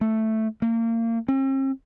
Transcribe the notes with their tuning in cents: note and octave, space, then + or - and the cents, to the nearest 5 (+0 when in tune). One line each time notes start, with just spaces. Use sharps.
A3 +0
A#3 -30
C4 +45